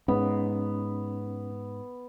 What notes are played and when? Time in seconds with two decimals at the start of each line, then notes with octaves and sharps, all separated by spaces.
0.08 G#2 B3 C#4